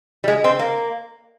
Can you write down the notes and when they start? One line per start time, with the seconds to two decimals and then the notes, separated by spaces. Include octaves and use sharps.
0.24 G3
0.28 G#3
0.44 C4
0.59 A#3